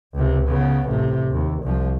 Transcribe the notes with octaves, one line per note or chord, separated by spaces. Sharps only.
C#2 C3
C#3 B3
A1 C3
D#2
C2 F3